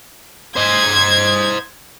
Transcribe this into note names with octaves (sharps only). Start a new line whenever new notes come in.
C5 D#5 G#6